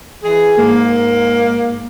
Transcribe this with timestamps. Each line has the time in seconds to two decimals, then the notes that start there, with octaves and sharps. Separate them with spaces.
0.23 E3 G#4
0.58 G#2 A#3